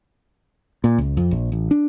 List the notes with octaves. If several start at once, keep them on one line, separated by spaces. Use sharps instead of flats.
A#2
C#2
F2
A#1
A1
D4